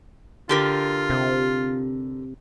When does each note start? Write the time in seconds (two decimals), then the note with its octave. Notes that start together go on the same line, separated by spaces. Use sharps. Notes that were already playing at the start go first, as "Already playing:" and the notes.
0.49 D3 F4 G4 A#4
1.10 C3